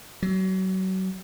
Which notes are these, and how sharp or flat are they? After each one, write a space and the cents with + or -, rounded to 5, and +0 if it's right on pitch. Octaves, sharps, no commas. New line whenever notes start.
F#3 +30